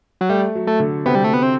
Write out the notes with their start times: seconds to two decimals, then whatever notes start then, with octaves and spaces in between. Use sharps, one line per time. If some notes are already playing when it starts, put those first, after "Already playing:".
0.21 F#3
0.29 G3 A3
0.55 F#3
0.67 A3
0.80 D3
1.06 C3 B3
1.15 G3
1.24 A3
1.34 B3
1.43 C4